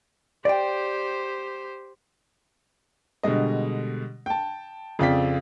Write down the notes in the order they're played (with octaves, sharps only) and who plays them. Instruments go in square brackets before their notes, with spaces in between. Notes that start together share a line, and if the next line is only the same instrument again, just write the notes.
[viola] G4 C5 [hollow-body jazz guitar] D5 G5
[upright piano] B2 D3 G3 G#3 D#5
G5 A5
F2 C#3 F4 D5 G5 B6